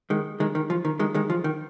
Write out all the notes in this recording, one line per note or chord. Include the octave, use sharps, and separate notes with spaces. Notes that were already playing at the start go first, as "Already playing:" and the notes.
D#3 G#3
D#3 G#3
D#3
F3
D#3
D#3 G#3
D#3 G#3
F3
D#3